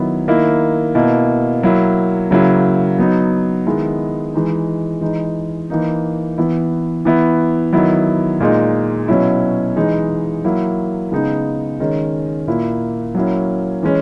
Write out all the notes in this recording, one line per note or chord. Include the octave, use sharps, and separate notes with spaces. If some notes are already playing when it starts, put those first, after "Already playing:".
Already playing: D#3 F#3 B3 E4
D#3 A#3 E4
B2 A#3 E4
F#3 A#3 E4
C#3 F#3 A#3 E4
F#3 B3 D#4
D#3 G#3 B3 E4
E3 G#3 D#4
E3 G#3 D#4
E3 A#3 D#4
E3 B3 E4
E3 B3 E4
D#3 F#3 B3 E4
A#2 G#3 D#4
B2 F#3 C#4 E4
E3 G#3 D#4
F#3 A#3 E4
C#3 G#3 B3 D#4
D#3 G#3 C#4
A#2 A#3 E4
F#3 A#3 C#4 E4
E3 G#3 C#4